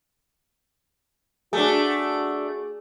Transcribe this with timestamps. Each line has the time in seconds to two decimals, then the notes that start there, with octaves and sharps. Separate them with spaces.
1.53 A3 D4 F#4 G#4